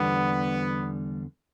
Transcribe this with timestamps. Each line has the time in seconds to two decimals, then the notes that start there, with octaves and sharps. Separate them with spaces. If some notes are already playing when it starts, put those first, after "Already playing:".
Already playing: E2 D3 G3 B3